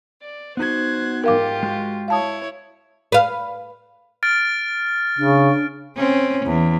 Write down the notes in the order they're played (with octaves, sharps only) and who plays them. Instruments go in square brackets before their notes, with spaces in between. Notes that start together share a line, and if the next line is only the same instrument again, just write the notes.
[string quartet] D5
[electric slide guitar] B3 D#4 F#4 [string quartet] C5 F#6 G#6
[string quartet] G#2 F4 G4 [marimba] A#4 F5 D6
[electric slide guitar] G#3 F#4
[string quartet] E4 C#5 [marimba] F5 A5 D#6
[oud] B4 F5
[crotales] F6 A6 D7
[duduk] C#3 [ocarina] D4
[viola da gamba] C4 C#4
E2